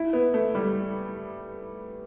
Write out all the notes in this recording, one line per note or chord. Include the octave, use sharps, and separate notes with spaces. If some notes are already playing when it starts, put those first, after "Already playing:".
Already playing: E4
B3
A3
G3